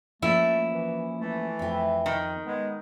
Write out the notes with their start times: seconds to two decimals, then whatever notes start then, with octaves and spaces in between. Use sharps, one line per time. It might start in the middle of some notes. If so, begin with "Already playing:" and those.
0.22 F3 A3 A#3 C#4 E4
0.72 E3
1.21 E3 A3
1.59 F2 C4
2.06 D#3
2.47 G#3 B3